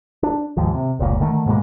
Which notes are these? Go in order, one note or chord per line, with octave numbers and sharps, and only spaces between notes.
D4
D#2 G#2 F3
C3
F1 C#2 A#2
D3 D#3 A3
G#2 B2 G#3 A#3